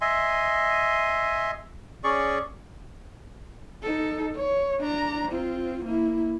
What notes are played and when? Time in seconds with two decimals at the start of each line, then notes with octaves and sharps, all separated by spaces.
0.01 D#5 E5 G#5 C6
2.04 C#4 G#4 D5 C#6
3.83 D#4 A4
4.36 C#5
4.80 D4 A#5
5.32 C4 F4
5.85 A#3 E4